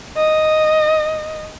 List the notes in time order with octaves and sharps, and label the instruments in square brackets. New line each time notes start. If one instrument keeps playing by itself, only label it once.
[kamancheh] D#5